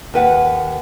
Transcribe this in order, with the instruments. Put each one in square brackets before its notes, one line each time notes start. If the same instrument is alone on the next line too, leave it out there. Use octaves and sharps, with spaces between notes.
[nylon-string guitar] D#2 B4 F#5